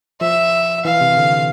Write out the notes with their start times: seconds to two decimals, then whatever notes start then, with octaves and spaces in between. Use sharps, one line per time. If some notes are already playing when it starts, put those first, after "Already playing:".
0.21 F3 E5
0.85 E3 F5
1.01 C3
1.17 D3